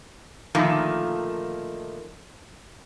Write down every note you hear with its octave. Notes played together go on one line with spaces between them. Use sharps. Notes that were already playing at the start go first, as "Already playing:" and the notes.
A#2 D3 D#3 F3 A3